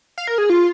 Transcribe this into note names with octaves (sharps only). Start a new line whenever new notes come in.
F5
A#4
G#4
F4